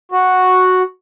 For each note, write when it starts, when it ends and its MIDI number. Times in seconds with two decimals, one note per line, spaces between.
0.12 0.82 66